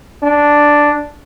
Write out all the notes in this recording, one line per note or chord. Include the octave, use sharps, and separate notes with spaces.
D4